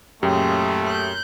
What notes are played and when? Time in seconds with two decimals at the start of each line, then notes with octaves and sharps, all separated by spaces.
0.23 F#2 A#2 C#3 G#3 A3 G4 G5
0.87 F#6 G6